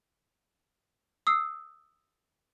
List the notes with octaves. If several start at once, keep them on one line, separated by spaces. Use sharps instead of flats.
D#6 E6 C7